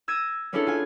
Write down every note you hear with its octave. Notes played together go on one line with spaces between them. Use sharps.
E6 G#6 A#6 D#7 E7
B3 C#4 D4 E4 G#4 A4
F4 G#5